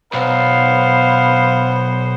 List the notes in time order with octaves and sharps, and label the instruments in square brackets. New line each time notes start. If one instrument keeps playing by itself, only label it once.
[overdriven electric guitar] B1 [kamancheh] B3 C5 [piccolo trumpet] F5